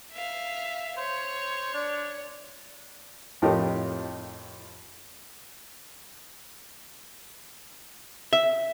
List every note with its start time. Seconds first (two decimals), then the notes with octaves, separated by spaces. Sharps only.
0.12 E5 F5
0.97 C5 C#5
1.74 D4 D5
3.42 F2 A2 F4 G4 A#4 D#5
8.33 E5